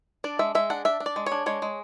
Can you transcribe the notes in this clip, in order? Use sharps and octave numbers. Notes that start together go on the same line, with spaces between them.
D4 D5
G#3 E5
G#3 E5
D4 F#5
D4 E5
D4
D5
G#3
C#5
D4
G#3 C#5
G#3